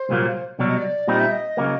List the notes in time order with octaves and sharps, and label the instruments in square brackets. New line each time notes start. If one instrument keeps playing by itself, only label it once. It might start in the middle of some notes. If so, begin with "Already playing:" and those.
Already playing: [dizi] C5
[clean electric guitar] C2 A#2 F#3 A#3
[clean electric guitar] C2 B2 F#3 [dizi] D5
[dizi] D#5
D5
[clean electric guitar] A#2 G3 C4 D#4 [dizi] D#5
[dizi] E5
D#5
[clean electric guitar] C#3 F#3 A#3